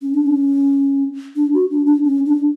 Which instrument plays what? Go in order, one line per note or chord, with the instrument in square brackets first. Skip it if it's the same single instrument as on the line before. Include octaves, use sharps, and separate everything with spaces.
[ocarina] C#4
D4
C#4
D4
F#4
D4
D4
C#4
D4